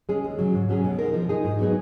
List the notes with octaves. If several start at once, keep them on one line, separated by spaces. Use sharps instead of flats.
G#3 C#4 G#4
D#2
C#3 F#3
G#2
F#3 C#4 G#4
B2
G#3 D#4 A#4
F3
G#3 D#4 G#4
G#2
F#3 B3 D#4 G#4